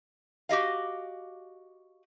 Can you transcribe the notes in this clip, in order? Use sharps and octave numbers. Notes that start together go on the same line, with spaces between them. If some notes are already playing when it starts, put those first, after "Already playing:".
F#4 G4 D#5 F5